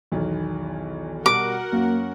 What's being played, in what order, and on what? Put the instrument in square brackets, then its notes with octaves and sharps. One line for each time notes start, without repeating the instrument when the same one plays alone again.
[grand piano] B1 E2 D#3
[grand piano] B2 G3 [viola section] F#4 A#4 F#5 [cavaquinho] D6
[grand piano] F#2 C#4 [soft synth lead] A#3